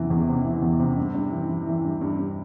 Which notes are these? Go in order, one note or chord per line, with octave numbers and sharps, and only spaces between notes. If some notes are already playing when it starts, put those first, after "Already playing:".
Already playing: E2 C3 E3
E2
C3
E3
E2
C3
G2
G2
E3
E3
E3
G2
G2
G2